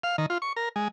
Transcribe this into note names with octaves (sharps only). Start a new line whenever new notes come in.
F5
D#3
F4
C#6
A#4
G#3